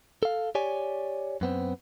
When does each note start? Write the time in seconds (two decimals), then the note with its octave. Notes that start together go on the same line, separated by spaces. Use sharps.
0.23 A4 F5
0.55 G4 C#5 D5 G#5
1.41 F#2 B3 C4